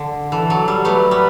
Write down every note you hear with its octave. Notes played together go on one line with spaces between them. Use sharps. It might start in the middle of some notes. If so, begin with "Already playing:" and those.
Already playing: D3
E3 A4
F#3
G3
F#3 A3 B4
G3